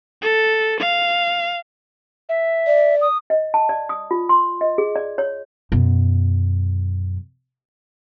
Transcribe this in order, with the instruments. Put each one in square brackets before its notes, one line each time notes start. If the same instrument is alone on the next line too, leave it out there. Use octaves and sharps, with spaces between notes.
[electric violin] A4
F5
[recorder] E5
[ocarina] D5
[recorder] D#6
[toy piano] D#5
A5
D5
D#6
F4
C6
D#5
G#4
D5
C#5
[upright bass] F#2 B2